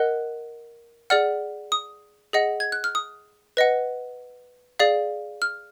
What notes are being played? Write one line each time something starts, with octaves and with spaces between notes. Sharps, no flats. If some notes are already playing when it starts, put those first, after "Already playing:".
Already playing: A#4 D#5 F#5 F#6
G#4 D5 F#5 F6
D#6
G#4 D#5 F#5
G#6
F#6
F6
D#6
B4 D#5 F#5
G#4 D5 F5
F6